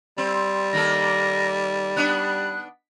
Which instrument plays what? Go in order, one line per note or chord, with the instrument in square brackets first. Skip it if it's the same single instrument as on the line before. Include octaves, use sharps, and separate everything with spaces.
[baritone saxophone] G3 [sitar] C4
[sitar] D#3 A#3 A4 [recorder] A#6
[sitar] B3 D4 [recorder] F#6